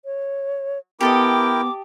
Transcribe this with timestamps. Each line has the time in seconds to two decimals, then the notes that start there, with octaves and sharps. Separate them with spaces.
0.05 C#5
1.01 B3 E4 G4 A4 A#4 D#5 G5 D6